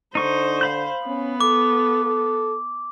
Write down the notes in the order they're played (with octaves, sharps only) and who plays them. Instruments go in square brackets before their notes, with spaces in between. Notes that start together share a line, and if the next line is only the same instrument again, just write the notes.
[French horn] D3 [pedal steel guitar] D#4 C#6 [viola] C5
[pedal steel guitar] F5 B5 G6
[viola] B3 [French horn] C#4
[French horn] A4 [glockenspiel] D6
[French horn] A4